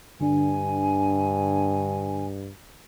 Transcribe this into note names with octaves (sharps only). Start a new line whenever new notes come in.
G2 D3 D4 G#5